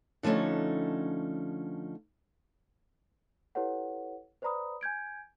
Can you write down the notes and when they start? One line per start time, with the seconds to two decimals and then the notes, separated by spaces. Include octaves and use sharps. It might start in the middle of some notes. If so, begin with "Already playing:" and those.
0.23 D3 F3 A3 C#4 D#4
3.55 E4 G4 A4 B4 C#5 F#5
4.42 B4 C5 D5 A#5 B5 D#6
4.81 G#5 G6 G#6 D7